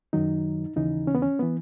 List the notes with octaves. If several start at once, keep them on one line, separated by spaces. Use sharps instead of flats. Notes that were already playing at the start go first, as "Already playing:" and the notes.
F#2 D#3 F#3 D#4
D#2 C#3 E3 D#4
C#4
B3
C#4
E3 B3